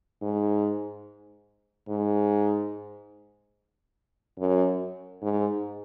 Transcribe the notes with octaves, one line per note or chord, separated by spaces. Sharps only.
G#2
G#2
F#2
G#2